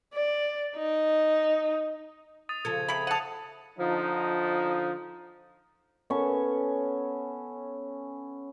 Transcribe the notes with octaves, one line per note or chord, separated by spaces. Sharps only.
D5
D#4
D#6 A6 D#7
C#3 F3 A4 G#6
C3 B5
F#5 A5 D#6 C#7 D#7
D3 F3 D#4
B3 C#4 A4 C#6